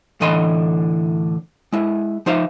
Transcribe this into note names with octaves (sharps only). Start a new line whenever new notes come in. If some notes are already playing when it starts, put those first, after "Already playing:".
A2 D3 E3 D#5 B5 C6
G#3 E4
F3 D#4 C5 E5 F5